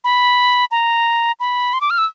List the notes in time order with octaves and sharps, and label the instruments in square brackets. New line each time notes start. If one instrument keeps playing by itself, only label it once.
[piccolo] B5
A#5
B5
C6
D6
F6
E6